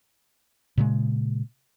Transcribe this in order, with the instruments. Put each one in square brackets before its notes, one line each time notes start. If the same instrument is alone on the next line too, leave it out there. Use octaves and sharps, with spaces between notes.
[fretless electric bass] A#2 C#3 G#3